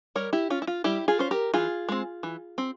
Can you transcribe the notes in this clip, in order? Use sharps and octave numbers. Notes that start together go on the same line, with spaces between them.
G3 A#4 C#5
E4 G4
C#4 F4
E4
F4
G3 E4 G4
F4 G#4
C#4 C5
G4 A#4
E3 F4 G#4
G#3 C4
E3
C4